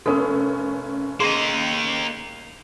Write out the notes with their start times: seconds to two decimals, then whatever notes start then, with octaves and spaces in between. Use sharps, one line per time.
0.06 F1 C#4 A4 A#4
1.20 A#3 G#4 D#5 C6